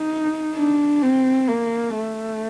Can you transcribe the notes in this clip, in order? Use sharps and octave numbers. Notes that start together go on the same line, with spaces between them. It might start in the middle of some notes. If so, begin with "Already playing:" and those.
Already playing: D#4
D4
C4
A#3
A3